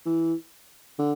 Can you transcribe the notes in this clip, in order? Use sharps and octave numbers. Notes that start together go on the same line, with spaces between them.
E3
D3